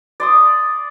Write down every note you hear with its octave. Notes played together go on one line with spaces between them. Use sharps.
D5 C6 D#6